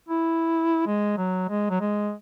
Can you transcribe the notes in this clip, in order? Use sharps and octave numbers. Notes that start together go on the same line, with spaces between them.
E4
G#3
F#3
G#3
F#3
G#3